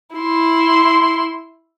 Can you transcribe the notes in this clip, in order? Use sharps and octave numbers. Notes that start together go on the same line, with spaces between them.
E4 C6